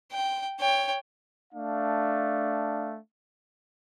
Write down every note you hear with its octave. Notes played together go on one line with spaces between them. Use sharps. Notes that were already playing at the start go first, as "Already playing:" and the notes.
G5
C#5 G5
A3 D4 F5